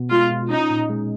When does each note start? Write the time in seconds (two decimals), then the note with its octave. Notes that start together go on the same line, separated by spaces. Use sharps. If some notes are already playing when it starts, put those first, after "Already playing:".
Already playing: B2 B3
0.11 G#3 F4
0.31 B2
0.51 C#4 D#4
0.70 A#2
0.90 G#3